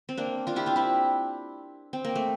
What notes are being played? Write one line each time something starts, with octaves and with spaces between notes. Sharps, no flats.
C4
A#3 D4
D4 F4
E4 G4
D4 F4
C4 E4
C4
A#3
A3